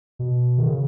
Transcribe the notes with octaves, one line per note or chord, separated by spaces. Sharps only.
B2
D#3
C#3